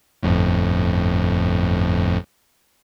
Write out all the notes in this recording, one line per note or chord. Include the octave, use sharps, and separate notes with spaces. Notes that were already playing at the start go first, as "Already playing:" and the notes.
G1 F2 A2